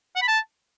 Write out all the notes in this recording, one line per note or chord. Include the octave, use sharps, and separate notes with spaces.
F#5
B5
A5